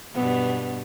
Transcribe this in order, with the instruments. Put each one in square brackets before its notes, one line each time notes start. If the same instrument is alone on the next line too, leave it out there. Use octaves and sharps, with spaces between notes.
[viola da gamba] G2 B2 [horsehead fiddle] B3